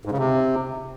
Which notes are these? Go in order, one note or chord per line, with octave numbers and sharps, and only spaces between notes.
G#2
C#3
C3